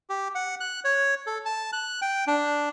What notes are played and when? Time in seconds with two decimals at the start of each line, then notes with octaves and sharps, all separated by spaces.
0.10 G4
0.35 F#5
0.60 F#6
0.84 C#5
1.27 A4
1.45 A5
1.73 F#6
2.02 G5
2.27 D4